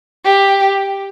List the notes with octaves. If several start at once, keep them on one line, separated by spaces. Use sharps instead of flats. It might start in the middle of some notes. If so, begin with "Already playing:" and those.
G4